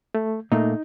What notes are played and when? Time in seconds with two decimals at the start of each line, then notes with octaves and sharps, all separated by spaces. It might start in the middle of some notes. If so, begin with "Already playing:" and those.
0.15 A3
0.52 A#2 A3 A#3 D#4